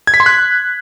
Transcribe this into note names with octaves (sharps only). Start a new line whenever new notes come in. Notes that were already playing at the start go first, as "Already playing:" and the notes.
G#6
B6
C6
F#6